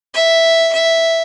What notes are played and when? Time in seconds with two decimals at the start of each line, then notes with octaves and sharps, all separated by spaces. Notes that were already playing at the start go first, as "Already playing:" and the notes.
0.14 E5
0.73 E5